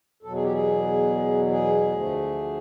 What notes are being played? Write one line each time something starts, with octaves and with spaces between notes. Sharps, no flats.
E2 B2 F#3 A4
G#4
G4
G#4
G#4
D2 D3 F3 A3